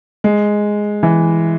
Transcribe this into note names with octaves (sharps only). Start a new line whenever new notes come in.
G#3
E3